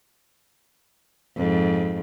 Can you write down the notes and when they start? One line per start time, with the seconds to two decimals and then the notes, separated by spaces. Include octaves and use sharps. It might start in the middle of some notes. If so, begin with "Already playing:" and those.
1.36 F2 G#2